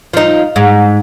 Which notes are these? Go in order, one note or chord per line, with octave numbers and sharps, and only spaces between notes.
F3 D#4
G#2